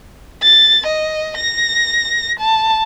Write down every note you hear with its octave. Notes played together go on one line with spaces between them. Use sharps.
A6
D#5
A#6
A5